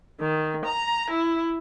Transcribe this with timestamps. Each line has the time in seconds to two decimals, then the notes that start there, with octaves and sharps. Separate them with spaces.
0.21 D#3
0.66 A#5
1.11 E4